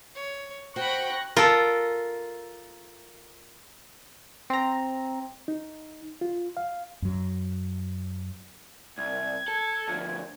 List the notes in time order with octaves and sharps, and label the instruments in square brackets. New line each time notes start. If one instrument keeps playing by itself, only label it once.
[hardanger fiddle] C#5
[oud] F#4 C5 [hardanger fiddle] G5 B5 [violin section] C#6 F#6 A#6
[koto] F4 A4 [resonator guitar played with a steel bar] A#4
[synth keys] C4 A#5
[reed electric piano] D#4
F4
F5
[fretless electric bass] F#2 F#3
[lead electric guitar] C2 [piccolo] G#6
[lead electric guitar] A4
D2 F3